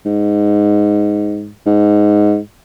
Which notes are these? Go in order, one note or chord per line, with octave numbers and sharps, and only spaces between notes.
G#2
G#2